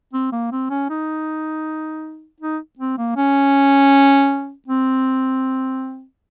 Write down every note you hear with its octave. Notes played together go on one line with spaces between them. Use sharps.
C4
A#3
C4
C#4
D#4
D#4
C4
A#3
C#4
C4